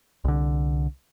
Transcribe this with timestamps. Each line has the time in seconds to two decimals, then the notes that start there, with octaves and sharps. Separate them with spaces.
0.25 C2 D3